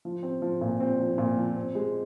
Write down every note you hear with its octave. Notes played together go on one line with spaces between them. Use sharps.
F3
C4
F3
A#2
C4
F3
A#2
F3
C4
G#3